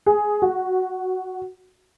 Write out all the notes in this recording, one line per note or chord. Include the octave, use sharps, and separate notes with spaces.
G#4
F#4